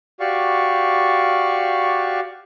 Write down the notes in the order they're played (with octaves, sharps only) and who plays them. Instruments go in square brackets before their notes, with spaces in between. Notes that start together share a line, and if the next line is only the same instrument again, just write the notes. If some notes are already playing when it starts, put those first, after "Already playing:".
[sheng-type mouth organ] F#4 G4 D5 F5 C#6